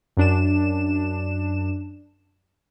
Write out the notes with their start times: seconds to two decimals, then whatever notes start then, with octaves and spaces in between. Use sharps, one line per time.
0.17 F#2 D4 E7